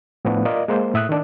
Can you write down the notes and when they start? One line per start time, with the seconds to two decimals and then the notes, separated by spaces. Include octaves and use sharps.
0.25 A2 F3 A3 B3 D4
0.45 F4 A#4 D5 D#5
0.68 G#3 A#3 C5
0.94 A2 E5 D#6 F#6
1.09 D#3 D4